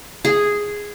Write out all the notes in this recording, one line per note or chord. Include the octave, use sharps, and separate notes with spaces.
G#4